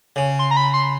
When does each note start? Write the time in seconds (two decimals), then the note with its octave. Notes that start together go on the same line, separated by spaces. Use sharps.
0.16 C#3
0.39 C6
0.51 A#5
0.57 B5
0.74 C6